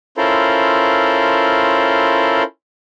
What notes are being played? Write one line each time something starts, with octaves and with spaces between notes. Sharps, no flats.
C#4 E4 F4 A4 A#4 C5